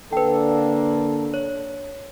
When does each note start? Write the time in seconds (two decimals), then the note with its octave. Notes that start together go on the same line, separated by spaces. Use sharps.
0.13 D3 A#3 D4 A4 B4 G5
1.34 C#5